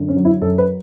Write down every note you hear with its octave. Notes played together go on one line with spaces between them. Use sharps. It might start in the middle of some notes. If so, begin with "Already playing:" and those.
Already playing: F#2 D3
C#4
F#3
E4
F#2 A4
B4